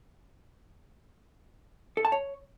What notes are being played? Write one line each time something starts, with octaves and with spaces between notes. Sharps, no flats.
A4
A5
C#5